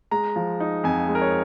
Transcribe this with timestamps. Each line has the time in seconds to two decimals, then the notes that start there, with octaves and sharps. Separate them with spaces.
0.11 G#3 A#5
0.36 F3
0.60 D#4
0.84 F2 G#5
1.08 G#3
1.15 A#4
1.21 C#5